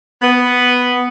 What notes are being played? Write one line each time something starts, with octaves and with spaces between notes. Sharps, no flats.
B3